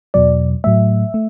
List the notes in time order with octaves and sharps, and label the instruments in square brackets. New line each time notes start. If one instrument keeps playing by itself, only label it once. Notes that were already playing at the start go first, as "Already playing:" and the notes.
[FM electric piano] E2 B2 F#3 D5
A2 F#3 A3 E5
A3